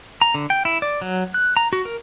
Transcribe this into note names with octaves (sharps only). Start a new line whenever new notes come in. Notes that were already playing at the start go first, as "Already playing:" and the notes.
A#5
D3
G5
E4
D5
F#3
F#6
A#5
F#4
A#4